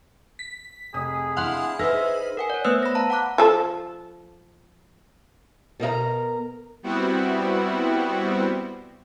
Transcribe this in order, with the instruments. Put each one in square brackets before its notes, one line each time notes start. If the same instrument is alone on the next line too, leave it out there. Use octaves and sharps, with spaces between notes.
[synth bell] B6
[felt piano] F1 D#6 [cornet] G#4
[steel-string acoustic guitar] D4 E4 [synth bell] F5 F#5 C6
[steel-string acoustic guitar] D#4 C5 [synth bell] G#4 B4 [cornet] E5 [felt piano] E6 F6 A#6
[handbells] A#4 F#5 G#5
C#5 D5
A3 B3 B4 C5 E6 F#6
B5 A#6
F5 A5 A#5
F#5 A5 A#5 D6 F#6
[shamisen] F3 A4
[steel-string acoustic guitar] B2 A#4 D#5 A#5
[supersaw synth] G3 B3 C4 E4 F#4